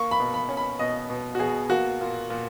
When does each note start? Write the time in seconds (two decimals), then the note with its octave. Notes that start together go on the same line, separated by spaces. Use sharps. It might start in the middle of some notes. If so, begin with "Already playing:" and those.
Already playing: A#3 C#6
0.11 B5
0.20 B2
0.34 B5
0.49 C#4
0.57 B5
0.79 B2 D#5
1.10 B2
1.35 F#4
1.40 B2 G#4
1.70 A#3 F#4
2.01 A#2
2.30 A#2